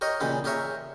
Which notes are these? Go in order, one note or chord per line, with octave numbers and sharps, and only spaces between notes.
G4 A#4 C#5 D#5
A#2 C#3 E3 G4
G4 G#4 A#4 C#5 E5